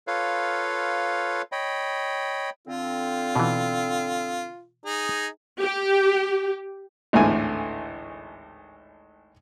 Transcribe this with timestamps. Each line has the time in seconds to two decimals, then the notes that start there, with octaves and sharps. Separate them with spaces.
0.07 F4 A4 B4 C#5 F5
1.52 C#5 D#5 G5 B5
2.67 D3 C4 F4
3.36 B2 E3
4.85 D#4 G#4
5.60 G4
7.13 G#1 D2 A2 E3 G#5